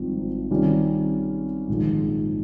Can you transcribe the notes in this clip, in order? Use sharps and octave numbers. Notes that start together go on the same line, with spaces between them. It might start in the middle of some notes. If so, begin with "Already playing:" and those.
Already playing: G#1 G2 F3 C4 D#4
C3 D#3 G3 C#4 F4
A#1 G#2 D#3